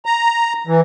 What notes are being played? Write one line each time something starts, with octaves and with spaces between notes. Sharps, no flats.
A#5
E3